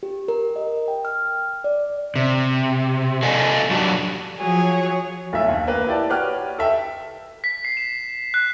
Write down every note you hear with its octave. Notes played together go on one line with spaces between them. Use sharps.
G4
A#4
D#5
G5
F6
D5
C3
A4 D5 D#5 F5 G#5
F#3 D4 F#4 G4
F3 F#3 G#4 C#5
B1 A3 E5
D#2
A#3 B4 F5
E4 G4 D5 A5
F#4 G4 B4 C#5 D6 F6
A4 E5 G5
B6
C7
E7
F#6